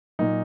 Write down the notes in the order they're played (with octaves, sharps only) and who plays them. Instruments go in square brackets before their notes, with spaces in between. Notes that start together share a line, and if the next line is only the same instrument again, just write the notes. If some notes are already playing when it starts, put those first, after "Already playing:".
[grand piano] A#2 F#3 D#4